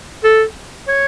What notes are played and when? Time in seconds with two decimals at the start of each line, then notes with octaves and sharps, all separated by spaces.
0.24 A4
0.88 C#5